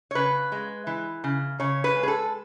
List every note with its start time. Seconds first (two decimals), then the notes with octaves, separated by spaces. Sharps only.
0.11 C#5
0.15 C#3 B4
0.52 G#3
0.87 E3
1.24 C#3
1.60 C#3 C#5
1.84 B4
1.96 G#3
2.03 G#4
2.08 A4